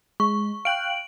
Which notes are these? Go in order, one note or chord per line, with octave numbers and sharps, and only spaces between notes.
G#3 C#6
F5 G5 F#6 D7 F#7